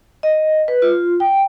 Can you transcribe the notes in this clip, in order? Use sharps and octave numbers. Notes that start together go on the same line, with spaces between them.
D#5
B4
F4
G5